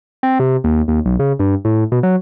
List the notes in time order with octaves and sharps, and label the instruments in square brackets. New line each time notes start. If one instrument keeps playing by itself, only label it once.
[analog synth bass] C4
C3
D#2
D#2
B1
C#3
G2
A2
B2
F#3